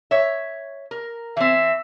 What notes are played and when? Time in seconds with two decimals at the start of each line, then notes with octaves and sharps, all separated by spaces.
0.11 C#5 E5
0.91 A#4
1.37 E3 C4 E5